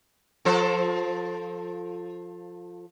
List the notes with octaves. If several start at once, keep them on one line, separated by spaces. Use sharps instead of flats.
F3 A4 C5